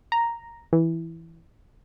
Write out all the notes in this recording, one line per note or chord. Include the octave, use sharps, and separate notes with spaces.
A#5
E3